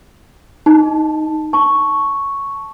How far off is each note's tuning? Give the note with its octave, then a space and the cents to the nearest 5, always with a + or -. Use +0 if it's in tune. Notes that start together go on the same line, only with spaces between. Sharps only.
D#4 +0 A5 +0
A5 +0 C#6 +0